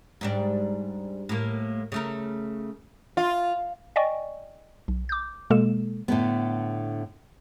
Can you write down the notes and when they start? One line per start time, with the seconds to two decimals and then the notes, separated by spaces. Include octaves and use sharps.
0.21 G#2 G3 D4
1.29 A2 A#3
1.92 C#3 A3 A#4
3.17 F4
3.96 D5 D#5 G5 G#5 C#6
4.88 B1
5.09 D6 G6
5.50 B2 G#3 A#3 A4 E7
6.08 A2 D3 B3